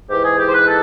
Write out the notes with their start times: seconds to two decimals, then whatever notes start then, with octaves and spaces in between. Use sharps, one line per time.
0.09 G#2 E3 G4
0.24 G#4
0.38 G4
0.49 C5
0.53 B4
0.67 A4